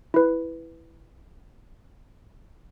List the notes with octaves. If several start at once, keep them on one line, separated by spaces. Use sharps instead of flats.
E4 B4